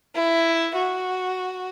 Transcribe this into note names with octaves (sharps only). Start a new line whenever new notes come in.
E4
F#4